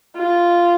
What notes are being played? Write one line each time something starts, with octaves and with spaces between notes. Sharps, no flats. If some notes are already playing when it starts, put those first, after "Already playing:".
F4